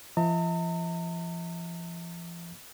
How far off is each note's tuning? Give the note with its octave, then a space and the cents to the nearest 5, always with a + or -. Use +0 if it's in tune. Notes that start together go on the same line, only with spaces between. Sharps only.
F3 -40 E5 -45 A#5 -45